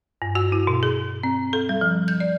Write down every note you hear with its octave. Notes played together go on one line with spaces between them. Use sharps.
G2
F#4
E4
B2
G#4
C4
A4
G3
F3
G6
D5